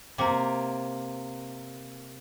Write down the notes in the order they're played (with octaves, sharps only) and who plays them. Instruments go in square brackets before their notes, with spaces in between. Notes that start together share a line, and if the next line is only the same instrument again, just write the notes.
[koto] C3 A#3